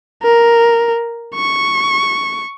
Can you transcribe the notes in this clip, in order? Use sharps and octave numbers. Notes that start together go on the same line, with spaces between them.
A#4
C#6